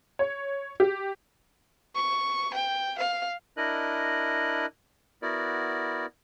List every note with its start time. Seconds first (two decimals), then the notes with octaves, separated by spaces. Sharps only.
0.19 C#5
0.80 G4
1.95 C#6
2.54 G5
2.99 F5
3.57 D4 E4 A#4 D#5 F#6
5.22 B3 E4 F#4 A#4 D5